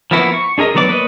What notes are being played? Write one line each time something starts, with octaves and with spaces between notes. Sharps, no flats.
F3 A#3 B3 E4 F#4
C#6
D4 G#4 A#4 D#5
D#3 F#3 B3 D5 D6
A#3 B4 C#5 D#5